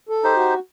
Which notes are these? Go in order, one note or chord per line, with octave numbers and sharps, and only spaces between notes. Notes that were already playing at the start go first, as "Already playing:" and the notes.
A4
D#4 G4 C5
F#4